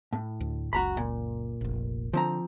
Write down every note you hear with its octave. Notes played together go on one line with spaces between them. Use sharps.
A2
D2
F#1 C#2 F#4 A#5 B5
A#2
F1 A#1
D3 F3 C4 A#5